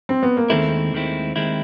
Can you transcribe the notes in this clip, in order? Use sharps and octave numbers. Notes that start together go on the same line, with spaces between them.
C4
B3
A#3
D#2 D#3 G#3 A3 C4 E4
D#2 D#3 G#3 C4 E4
D#2 D#3 G#3 C4 E4